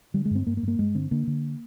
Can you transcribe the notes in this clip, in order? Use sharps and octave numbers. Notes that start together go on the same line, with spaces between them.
D3 G3
G#3
G2 C4
G2 A#3
A#3
G2
A#3
G2 G#3
D3 C4
D3 A#3
D3